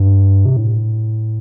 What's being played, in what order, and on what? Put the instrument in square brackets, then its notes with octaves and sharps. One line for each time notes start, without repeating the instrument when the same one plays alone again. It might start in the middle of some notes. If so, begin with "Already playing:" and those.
Already playing: [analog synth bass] G2
C3
A2